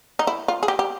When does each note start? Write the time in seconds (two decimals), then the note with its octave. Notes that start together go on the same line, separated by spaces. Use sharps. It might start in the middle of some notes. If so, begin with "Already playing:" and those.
0.19 D#4
0.27 E4
0.48 F4
0.63 G#4
0.68 G4
0.79 G4